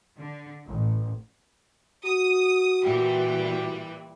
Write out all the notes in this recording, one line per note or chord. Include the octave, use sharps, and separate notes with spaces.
D3
A1
F#4 D#6
A#2 E3 G3